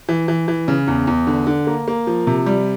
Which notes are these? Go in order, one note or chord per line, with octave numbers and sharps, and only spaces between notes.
E3
E3
E3
C#3
E2
E2
D3
D3
A#3
A#3
F3
C3
G3